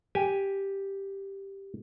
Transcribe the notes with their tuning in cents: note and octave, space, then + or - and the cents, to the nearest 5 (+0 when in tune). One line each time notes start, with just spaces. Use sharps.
G4 +0 G#5 +0